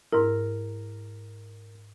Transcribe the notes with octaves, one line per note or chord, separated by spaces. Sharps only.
G#2 E4 A#4